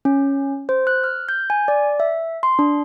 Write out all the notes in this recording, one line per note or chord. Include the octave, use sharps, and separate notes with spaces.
C#4
C5
F#6
F6
G6
G#5
D5
E5
C6
D4